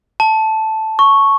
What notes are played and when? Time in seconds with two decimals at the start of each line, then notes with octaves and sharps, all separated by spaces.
0.20 A5
0.99 C#6